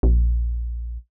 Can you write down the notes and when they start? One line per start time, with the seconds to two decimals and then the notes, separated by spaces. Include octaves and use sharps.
0.03 A#1